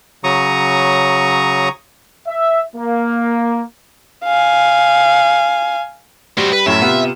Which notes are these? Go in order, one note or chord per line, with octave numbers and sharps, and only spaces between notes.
C#3 F#3 A#5 C#6 D#6
E5
A#3
F5 G#5
G3 C4 F#4
B4
F#2 A2 C#4 E5
C3 B3 F4